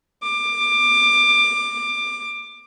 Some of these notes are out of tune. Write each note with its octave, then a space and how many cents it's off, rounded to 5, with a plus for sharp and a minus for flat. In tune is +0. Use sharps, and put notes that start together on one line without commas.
D6 +20